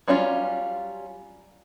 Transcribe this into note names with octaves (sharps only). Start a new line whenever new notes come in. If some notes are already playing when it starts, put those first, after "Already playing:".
F#3 G3 C#4 E4 F4